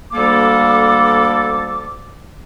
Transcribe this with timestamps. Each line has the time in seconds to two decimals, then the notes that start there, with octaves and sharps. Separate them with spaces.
0.13 D2 G3 A#3 A4 D6